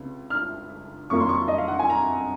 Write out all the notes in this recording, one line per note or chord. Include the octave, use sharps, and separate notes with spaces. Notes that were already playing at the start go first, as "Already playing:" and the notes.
Already playing: C#2 C3
F6
F2 D#3 F#3 A#3 F4 C#6
C6
C#6
D#5
F5
F#5
G#5
A#5